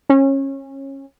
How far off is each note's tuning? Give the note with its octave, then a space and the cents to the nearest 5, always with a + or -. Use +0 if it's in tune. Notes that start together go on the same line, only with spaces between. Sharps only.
C#4 -25